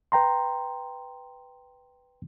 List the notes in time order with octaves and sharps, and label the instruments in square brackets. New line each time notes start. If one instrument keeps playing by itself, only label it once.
[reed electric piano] B4 G5 A#5 C6